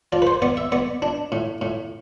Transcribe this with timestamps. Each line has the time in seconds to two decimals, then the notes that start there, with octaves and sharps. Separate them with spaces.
0.12 F3 D5
0.22 B4
0.27 C5
0.42 B3 D5
0.57 E5
0.72 B3 D5
1.02 D4
1.32 A2
1.61 A2